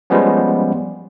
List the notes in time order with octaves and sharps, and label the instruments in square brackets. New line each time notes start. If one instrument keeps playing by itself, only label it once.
[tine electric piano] F3 G3 G#3 B3 C#4